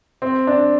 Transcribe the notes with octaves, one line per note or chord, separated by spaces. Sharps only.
C4
D4